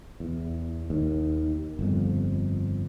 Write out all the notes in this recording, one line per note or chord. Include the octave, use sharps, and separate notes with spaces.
E2
D#2
G1 F2